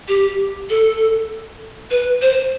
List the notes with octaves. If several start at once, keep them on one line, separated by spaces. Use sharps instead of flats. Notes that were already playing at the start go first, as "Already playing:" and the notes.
G4
A4
B4
C5